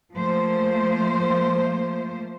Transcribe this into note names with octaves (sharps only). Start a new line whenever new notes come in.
F3 A3 A#3 C5